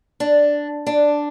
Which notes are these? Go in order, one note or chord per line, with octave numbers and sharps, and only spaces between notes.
D4
D4